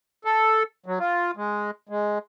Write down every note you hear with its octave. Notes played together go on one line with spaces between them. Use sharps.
A4
F#3
F4
G#3
G#3